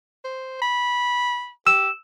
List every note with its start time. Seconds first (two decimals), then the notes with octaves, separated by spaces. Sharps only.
0.24 C5
0.62 B5
1.67 G4 E6 E7